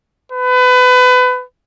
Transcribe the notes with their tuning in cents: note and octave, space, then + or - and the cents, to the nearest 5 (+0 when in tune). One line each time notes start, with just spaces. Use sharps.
B4 +25